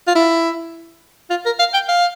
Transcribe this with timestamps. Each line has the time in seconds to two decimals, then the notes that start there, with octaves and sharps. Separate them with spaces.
0.07 F4
0.15 E4
1.30 F4
1.46 A#4
1.59 F5
1.74 G5
1.89 F5